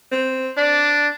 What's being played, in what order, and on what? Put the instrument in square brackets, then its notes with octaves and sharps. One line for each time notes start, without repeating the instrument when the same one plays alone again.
[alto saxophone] C4
[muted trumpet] D4 [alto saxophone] D5